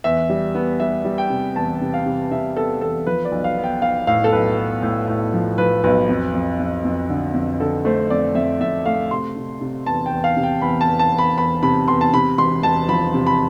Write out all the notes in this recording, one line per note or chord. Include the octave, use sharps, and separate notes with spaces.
E2 E5
G3
B3
G3 E5
G3
G5
C3
E2 A5
C3
F5
C3
C3 E5
B3 A4
E2 A4
F3 B4
D5
B1
F5
B3
G5
B3 F5
A2 F5
A4
B1 B4
B3
A2
A2
F3
F3 B4
B1 B4
F2
F2
F2
F2
D3
F2
D3 A4
A3 C5
F2 D5
F2 E5
F2 E5
A3 F5
C3 C6
C3
C3
E2 A5
G5
E2
F5
C3
G5
E2 B5
A5
E2
A5
E2
B5
E2 B5
C3 B5
E2 C6
A5
C3 B5
E1 C6
E1 A5
F3 B5
C3
B5